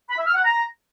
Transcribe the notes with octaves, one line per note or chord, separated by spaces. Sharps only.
B5
E5
F6
F#5
A#5